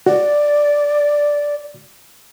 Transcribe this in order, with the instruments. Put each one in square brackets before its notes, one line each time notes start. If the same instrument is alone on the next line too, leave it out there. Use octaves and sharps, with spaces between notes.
[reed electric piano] F#4 [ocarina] D5